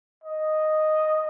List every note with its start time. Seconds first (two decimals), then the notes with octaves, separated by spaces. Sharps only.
0.24 D#5